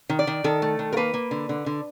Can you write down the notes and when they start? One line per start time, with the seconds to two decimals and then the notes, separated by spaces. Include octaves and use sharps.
0.09 D#3
0.19 D5
0.27 D#3
0.44 D#3 A4
0.62 A3
0.79 D#3
0.93 A#4
0.97 A#3 B4
1.14 A#3
1.31 D3
1.49 D3
1.66 D3